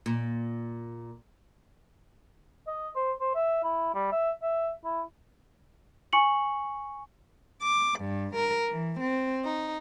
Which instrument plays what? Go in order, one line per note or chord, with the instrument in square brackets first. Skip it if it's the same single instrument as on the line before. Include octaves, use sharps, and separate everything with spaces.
[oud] A#2
[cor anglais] D#5
C5
C5
E5
E4
G3
E5
E5
E4
[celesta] G#5 C#6 C#7 F#7
[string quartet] D6
G2
A#4
E3
C4
D#4